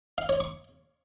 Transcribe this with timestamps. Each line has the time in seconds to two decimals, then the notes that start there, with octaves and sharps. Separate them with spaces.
0.18 F5
0.29 C#5
0.40 C#6